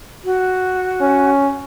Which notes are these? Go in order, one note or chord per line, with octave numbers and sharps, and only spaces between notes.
F#4
C#4